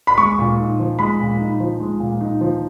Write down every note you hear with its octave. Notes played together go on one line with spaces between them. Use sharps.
B5
G#3 C#6
A#2
D#4
F3
G#3 B5
A#2
D#4
F3
G#3
A#2
D#4
F3